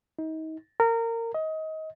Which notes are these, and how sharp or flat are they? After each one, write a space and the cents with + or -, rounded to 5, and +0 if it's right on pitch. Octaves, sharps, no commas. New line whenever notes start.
D#4 +35
A#4 -25
D#5 +25